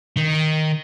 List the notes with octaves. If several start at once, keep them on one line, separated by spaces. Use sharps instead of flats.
D#3